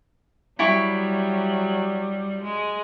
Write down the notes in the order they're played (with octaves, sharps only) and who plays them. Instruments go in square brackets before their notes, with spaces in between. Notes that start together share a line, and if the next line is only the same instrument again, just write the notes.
[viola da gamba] F#3 G3 [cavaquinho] E4 G4 C#6
[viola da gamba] G#3